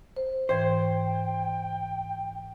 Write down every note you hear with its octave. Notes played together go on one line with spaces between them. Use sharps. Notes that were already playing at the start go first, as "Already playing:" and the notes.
C5
G#2 E3 C5 G5 G#6